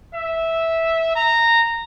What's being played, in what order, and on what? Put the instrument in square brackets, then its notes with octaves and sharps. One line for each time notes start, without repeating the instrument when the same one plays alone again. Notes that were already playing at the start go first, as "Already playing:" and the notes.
[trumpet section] E5
A#5